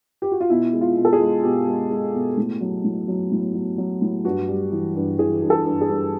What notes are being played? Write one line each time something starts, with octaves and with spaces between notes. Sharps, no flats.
G4
F#4
F4
B2 E4
G#3
F4
B2
A4
G#4
G#3
B2 G4
G#3
G#3
B2
A2
F#3
A2
F#3
A2
F#3
F#3
A2
G2 F#4
G3
E3
G2
E3 G#4
G2
A4
G2
G#4
G2